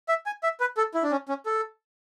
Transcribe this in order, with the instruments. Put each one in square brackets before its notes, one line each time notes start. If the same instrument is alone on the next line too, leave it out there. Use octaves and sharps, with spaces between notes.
[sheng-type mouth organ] E5
G#5
E5
B4
A4
E4
D4
C#4
C#4
A4